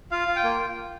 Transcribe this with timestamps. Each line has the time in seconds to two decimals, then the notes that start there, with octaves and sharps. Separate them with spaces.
0.11 F4 F5
0.28 F4
0.36 G5
0.44 A#3